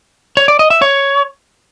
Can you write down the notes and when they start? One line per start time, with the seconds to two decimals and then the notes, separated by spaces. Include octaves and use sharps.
0.37 C#5
0.48 D5
0.59 D#5
0.70 E5
0.82 C#5